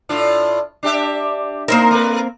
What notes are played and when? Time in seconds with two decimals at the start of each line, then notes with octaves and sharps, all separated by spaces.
0.09 A2 D4 F4
0.83 D4 G4 E5
1.68 A#3 C4 D#4 A#4
1.91 A3 B4